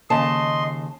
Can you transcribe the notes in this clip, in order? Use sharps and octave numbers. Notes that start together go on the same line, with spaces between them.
D#2 C#3 D#5 A5 C6